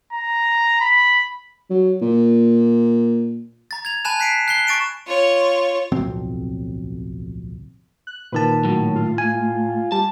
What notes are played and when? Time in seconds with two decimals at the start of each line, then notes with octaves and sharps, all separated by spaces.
0.12 A#5
0.80 B5
1.70 F#3
2.02 A#2
3.71 A#5 A6
3.85 G#6 F7
4.05 G#5 A5 B5 F#6 E7
4.20 F#6 B6 C7 D7 E7
4.48 F#6 C7 G7
4.67 C#6 A6 D7 E7
5.07 F4 C#5
5.92 D1 B1 F2 C4
8.07 F#6
8.32 A#2 D#3 B4 A5
8.65 A2 F#3
8.95 F4
9.18 G#5
9.92 G3 A5